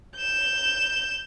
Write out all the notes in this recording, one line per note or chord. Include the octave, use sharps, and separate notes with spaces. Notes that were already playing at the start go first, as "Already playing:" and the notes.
G6 E7